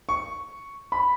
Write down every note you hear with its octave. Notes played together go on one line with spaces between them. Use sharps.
C#6
B5